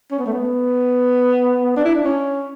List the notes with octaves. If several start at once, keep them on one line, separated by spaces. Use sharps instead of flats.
C#4
B3
A3
B3
D4
E4
D4
C#4